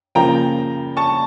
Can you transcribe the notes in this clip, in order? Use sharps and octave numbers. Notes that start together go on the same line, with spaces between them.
C#3 F3 A#3 G5 A#5
A5 C#6